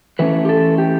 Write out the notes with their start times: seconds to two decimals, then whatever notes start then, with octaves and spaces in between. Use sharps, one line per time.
0.19 E3 A3 C#4 B4
0.45 G4
0.49 A4
0.78 G4